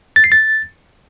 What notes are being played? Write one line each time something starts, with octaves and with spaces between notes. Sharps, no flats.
A6
C7
A6